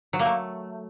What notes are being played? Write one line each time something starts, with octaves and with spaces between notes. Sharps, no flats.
F#3
A#3
A3